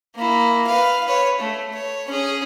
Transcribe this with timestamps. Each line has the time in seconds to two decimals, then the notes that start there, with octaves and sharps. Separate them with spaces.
0.16 A#3 E4
0.67 B4 F5
1.05 B4 C#5
1.39 A3
1.73 C#5
2.07 C#4 G#4